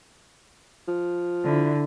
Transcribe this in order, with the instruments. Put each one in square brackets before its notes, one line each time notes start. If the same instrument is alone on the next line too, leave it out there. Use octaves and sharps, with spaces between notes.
[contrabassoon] F3
[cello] D3 E4